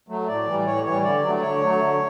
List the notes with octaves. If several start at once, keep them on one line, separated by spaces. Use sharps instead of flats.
F#3 A3
A2 D5
E3 G3
A2 C#5
E3 G3 C#5
D3 D5
F#3 A3
D3 C#5
F#3 A3
D3